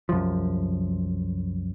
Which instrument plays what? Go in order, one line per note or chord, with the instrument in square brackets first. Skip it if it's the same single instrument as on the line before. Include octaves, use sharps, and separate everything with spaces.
[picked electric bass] C2 F#2 F3